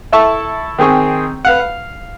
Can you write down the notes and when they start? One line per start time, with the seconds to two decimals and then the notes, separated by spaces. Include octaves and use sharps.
0.12 E4 A4 E5 A5 C#6
0.79 D#3 C4 G#4 C#6
1.45 B4 F5 F#5
1.60 F5